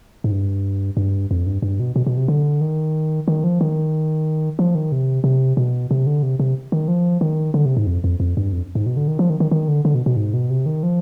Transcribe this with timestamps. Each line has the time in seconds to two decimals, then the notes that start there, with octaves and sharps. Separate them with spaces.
0.24 G#2
0.31 G2
0.97 G2
1.31 F2
1.46 G2
1.62 G2
1.80 B2
1.96 B2
2.06 B2
2.17 C3
2.28 D3
2.61 D#3
3.28 D#3
3.44 F3
3.61 D#3
4.59 F3
4.75 D#3
4.92 C3
5.24 C3
5.57 B2
5.91 C3
6.07 D3
6.23 C3
6.39 C3
6.72 D#3
6.88 F3
7.21 D#3
7.54 D3
7.65 C3
7.77 G#2
7.87 F2
8.04 F2
8.20 F2
8.37 G2
8.52 F2
8.75 G#2
8.86 B2
8.97 D3
9.08 D#3
9.19 F3
9.30 D#3
9.40 D#3
9.51 D#3
9.68 D3
9.85 D3
9.95 B2
10.06 B2
10.17 G#2
10.34 B2
10.50 C3
10.66 D#3
10.83 F3